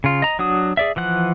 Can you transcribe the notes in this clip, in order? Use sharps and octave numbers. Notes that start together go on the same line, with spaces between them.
C#3 F4
D#5 A#5
F#3 D4 F#4 D#6
G#4 D5 E5
E3 F3 F#5 F#6